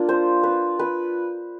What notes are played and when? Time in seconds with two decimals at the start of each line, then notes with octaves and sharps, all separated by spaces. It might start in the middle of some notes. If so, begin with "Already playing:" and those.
Already playing: A#3 D4 F4
0.09 C5
0.43 B4
0.79 B4